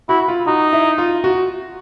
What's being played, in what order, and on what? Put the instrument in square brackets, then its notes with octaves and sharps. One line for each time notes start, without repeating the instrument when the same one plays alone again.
[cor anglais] E4 [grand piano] F#4
[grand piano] F4
[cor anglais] D#4 [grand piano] F#4
[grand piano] E4
F4
F#4